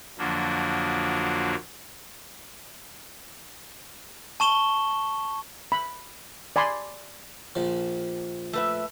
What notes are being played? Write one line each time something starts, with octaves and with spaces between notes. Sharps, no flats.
F2 D3 F3 F#3 A#3 D4
A5 C#6 E7 G7
B5
D5 G#5 B5 C6
A#1 F3
A3 B4 E5